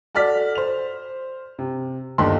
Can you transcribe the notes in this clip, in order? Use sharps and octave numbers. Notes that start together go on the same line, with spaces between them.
F#4 A4 D5 F6 B6
C5 F7
C3
G1 D#2 D4 D#4 A4 C6